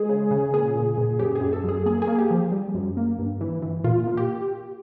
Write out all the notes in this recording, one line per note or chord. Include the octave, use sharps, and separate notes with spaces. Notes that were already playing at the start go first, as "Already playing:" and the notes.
Already playing: G#3 G#4
C#3
C#3
A#2 G#4
A#2
A#2
F#2 G4
G#4
F#2
A4
F#2 G#4
A#3 G#4
G#4
A#3
G4
F3
G3
F#2
A#3
G2
E3
E3
A#2 F4
A#2
G4